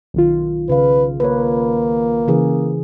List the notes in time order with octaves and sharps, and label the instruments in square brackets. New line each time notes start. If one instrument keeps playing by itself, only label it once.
[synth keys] B1 D#3 F4
[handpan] C#3 F5 [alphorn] B4
[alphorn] A#3 [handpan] B4 C#5
[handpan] C#3 E3 G#4